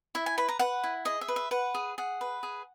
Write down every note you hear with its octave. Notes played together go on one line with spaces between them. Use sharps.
E4 E5
G#5
B4 B5
A#5
B4 F#5
E4
G#4 D#5
E5
B4
E5
B4 F#5
G#4
G#4 F#5
B4
G#4